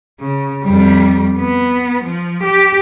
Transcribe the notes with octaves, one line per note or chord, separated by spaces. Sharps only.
C#3
F2 G3
B3
F3
G4